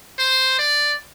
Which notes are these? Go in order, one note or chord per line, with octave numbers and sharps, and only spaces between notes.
C5
D5